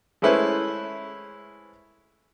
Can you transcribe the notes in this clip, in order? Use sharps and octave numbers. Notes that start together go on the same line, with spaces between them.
G#3 A3 C#4 E4 B4 C5